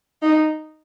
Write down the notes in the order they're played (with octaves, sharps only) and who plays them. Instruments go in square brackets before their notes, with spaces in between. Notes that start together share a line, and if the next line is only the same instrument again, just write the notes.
[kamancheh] D#4